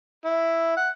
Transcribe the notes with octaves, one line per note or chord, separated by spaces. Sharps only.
E4
F#5